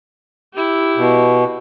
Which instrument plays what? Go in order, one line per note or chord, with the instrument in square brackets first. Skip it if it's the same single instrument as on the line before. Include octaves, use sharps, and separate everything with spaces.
[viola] E4 G4
[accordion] B2